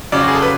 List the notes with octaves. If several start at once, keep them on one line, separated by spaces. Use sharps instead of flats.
F2 C#3 F#3 D5
F#4
G#4
A4
B4